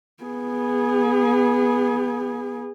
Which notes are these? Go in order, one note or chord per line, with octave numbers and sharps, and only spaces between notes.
B3 G#4